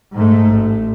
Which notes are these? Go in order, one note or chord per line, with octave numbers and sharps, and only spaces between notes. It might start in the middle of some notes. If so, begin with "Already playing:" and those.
G#2 A3
A1